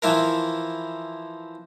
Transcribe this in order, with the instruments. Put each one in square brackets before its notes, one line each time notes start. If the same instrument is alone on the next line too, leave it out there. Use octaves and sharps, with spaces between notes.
[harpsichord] E3 F3 E4 A#4